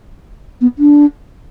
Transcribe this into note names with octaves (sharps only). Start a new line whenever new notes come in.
B3
D4